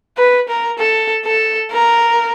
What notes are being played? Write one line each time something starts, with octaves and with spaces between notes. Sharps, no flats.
B4
A#4
A4
A4
A#4